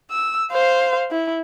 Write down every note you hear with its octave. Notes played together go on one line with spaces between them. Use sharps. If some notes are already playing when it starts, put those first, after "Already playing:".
E6
C5 F5
E4